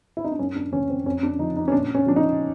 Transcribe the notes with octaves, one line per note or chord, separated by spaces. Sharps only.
E4
D#4
D4
F#2 C#4
D4
C#3 E3 C#4
C4
F2 C#4
D4
C#3 F3 D#4
D#4
C#4
A#2 D4
C#4
F3 D4
D#4